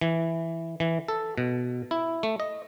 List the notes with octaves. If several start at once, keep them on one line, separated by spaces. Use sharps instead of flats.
E3
E3
A4
B2
E4
A3
D#5